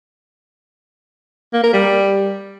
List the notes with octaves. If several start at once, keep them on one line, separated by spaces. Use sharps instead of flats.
A#3
A#4
G3